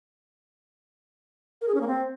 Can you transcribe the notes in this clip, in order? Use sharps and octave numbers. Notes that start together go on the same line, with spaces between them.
A#4
G#4
C#4
A#3
C4